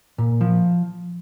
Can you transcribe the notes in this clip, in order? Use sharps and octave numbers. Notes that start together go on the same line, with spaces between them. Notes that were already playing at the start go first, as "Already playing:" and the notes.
A#2
F3